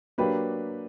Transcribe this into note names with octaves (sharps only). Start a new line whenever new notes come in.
F#3 A#3 D4 G4 B4